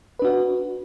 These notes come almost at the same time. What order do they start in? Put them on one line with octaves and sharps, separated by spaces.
B4 D4 F#4